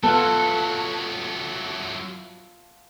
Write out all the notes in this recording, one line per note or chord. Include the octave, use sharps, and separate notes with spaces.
F#3 B3 E4 F4 A4 F#5 A5